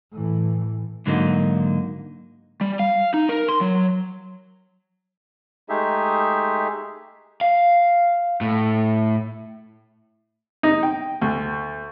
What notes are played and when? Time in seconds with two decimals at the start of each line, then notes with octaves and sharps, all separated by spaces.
0.12 A2 E3
1.06 G#2 D3 F#3 A#3 C4 D#4
2.61 G3
2.79 F5
3.14 D#4
3.29 A#4
3.49 C6
3.61 F#3
5.69 G#3 A3 D#4 G4 G#4 E5
7.41 F5
8.41 A2
10.63 D#4
10.83 G5
11.22 D2